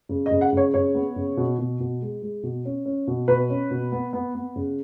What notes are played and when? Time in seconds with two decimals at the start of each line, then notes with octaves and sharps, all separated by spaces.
0.09 C#3
0.26 D#5
0.31 C#3
0.41 F#5
0.53 C#3 C#5
0.74 C#3 C#5
0.95 B3
1.16 C#3
1.37 B2
1.58 B2
1.80 B2
2.02 G#3
2.22 G#3
2.43 B2
2.65 C#4
2.85 C#4
3.07 B2
3.28 B2 B4
3.50 C#4
3.71 B2
3.92 B3
4.13 B3
4.35 B3
4.56 C#3